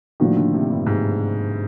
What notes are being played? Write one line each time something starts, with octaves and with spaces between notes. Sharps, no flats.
A2 D#3 F3 A#3 D4 F#4
D3
C3
G2
G#2